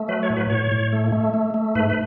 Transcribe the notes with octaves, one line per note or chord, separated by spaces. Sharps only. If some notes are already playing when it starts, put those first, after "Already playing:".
Already playing: A3
F#3 B4
C#5
A2
B4
A2 C#5
A2
A3
A3
A3
A3
G#2 B4
B4